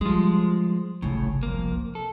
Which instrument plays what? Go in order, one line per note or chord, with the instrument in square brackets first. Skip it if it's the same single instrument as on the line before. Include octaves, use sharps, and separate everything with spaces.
[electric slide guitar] F3 G#3 [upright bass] G3
[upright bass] G1 C2 [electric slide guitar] A2 C#3
[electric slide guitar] F2 A#3
A4